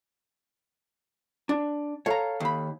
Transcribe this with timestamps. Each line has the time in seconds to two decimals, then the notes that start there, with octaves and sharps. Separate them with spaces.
1.49 D4
2.06 A4 C#5 F5 A#5
2.40 D#2 B5